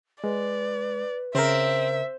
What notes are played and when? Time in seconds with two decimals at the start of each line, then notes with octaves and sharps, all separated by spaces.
0.24 G#3 B4 D5
1.35 C#3 C4 A#4 E5